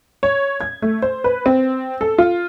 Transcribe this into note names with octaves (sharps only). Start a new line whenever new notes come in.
C#5
G#6
A3
C5
B4
C4
A4
F4